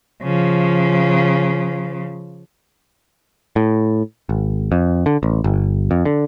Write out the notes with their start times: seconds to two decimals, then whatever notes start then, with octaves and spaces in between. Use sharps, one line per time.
0.23 C#3 F3
3.56 A2
4.29 G#1
4.72 F2
5.06 D3
5.23 A1
5.44 G1
5.91 F2
6.05 D3